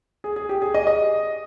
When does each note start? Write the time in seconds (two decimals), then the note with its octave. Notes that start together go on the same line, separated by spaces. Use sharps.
0.24 G#4
0.36 G#4
0.49 G4
0.62 G#4
0.74 D#5
0.87 D#5